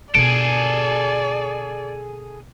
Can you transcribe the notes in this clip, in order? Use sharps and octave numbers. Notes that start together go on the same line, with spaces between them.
B2 D3 G#4 A4 D5 D7